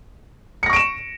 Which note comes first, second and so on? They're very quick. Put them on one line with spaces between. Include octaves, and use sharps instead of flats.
C#7 A#6 C#6 D7 E7